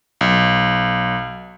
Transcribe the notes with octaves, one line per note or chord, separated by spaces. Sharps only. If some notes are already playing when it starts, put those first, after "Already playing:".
B1